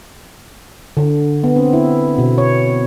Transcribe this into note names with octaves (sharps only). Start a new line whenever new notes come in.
D3
B3
C4
E4
B2
C#5